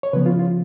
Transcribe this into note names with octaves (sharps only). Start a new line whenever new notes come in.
C#5
C#3 F3 B3 B4
F4
F4